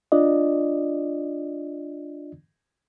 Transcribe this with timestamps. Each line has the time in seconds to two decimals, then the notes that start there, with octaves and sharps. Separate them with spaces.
0.12 D4 F4 D5 D#5